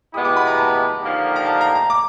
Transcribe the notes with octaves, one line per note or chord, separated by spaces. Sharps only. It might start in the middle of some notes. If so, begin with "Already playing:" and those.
B2 G#3 B3 E4 G4 D#6
D6
B5
A#5
A5
D3 F3 A#3 D#4 G4
A#5
A5
A#5
A#5
D6